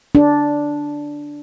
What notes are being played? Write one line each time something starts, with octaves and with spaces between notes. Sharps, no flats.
D4